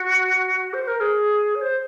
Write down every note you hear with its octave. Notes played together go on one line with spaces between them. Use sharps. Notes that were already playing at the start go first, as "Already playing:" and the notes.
Already playing: F#4
C5
A#4
G#4
C#5
C5